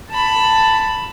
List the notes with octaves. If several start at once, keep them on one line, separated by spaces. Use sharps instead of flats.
A5 B5